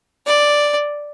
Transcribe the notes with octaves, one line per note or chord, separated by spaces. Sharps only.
D5